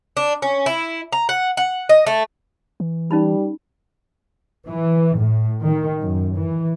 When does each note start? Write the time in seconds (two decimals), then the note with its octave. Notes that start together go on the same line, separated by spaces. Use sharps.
0.17 D4
0.42 C#4
0.66 E4
1.12 A#5
1.29 F#5
1.57 F#5
1.89 D#5
2.07 A3
2.80 E3
3.11 G3 C#4 D#4 B5
4.68 E3
5.19 A2
5.63 D#3
6.02 F#2
6.36 E3